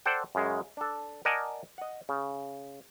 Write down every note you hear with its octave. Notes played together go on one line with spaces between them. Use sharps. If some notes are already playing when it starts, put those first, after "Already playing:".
A4 C5 D5 F#5 G5
F#2 C#3 G#3
D4 A4
A#4 D5 D#5 F#5 G#5 A5
D#5 F#5
C#3